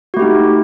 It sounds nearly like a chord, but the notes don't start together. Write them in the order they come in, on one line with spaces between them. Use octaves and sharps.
F#4 A3 G4 D#4